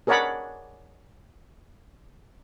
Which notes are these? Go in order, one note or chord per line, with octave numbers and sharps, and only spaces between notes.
G#4 A#4 C#5 D5 F#5 B5